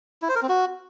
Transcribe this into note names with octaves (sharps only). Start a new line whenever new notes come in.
E4
C5
A#4
C4
F#4